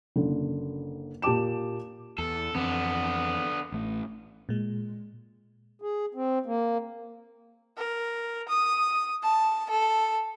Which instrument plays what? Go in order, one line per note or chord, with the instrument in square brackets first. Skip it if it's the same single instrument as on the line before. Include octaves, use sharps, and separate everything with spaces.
[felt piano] F#1 D3
A#2 G4 A5 D6 E7
[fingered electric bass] E2 [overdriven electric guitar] A4
[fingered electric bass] F2 E3 C4 [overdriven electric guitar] D3 B3
[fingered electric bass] A1 A3
[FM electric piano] A#2 G#3
[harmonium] G#4
C4
A#3
[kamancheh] A#4
D#6
A5
A4